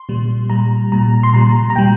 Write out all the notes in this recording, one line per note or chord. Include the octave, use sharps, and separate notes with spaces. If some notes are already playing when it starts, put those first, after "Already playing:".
Already playing: C6
A#2 G3
A#2 G3 A#5
A#2 G3 A#5
C6
A#2 G3 A#5
A#5
A#2 G3 G5